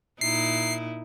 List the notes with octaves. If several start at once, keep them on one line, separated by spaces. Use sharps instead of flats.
A#2 D#4 E4 C7